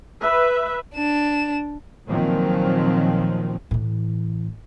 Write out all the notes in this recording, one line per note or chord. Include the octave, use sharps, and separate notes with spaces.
B4 E5
D4 E7
A#2 D#3 F3 F#3 C4
A2 E3